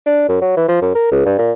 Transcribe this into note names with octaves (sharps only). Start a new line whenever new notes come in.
D4
F#2
F#3
E3
F3
F#2
A#4
C#2
G2
A#2